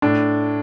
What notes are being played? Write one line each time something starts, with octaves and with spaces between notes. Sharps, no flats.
A2 D4